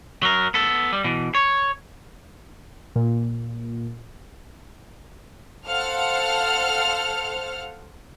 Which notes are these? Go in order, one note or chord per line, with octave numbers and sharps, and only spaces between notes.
F#3 A#4
B3 A4
G3
B2 E3
C#5
A#2
A4 C5 F5 F#5 F6